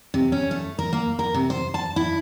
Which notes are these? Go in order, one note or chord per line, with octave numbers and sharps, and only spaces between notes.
C3
C#4
A3
A#4
A#3
A#4
C3
C5
A5
E4